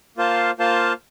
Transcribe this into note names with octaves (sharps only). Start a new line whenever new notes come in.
A#3 F4 C5 F5 A5
A#3 F4 C5 F5 A5